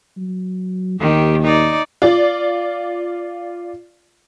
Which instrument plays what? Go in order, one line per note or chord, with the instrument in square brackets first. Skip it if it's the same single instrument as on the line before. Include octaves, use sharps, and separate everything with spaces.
[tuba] F#3
[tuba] D#2 [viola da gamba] D#3 G4
[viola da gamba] D#4 D5
[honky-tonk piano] F4 D5